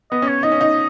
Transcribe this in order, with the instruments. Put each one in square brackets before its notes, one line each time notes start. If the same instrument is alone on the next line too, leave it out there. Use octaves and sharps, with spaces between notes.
[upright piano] B3 [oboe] D#5
[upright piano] C#4
[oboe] C#5
[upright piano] D#4 [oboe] D#5
[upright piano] C#4
D#4